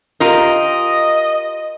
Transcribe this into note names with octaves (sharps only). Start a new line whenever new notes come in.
F4 G4 A#4 D#5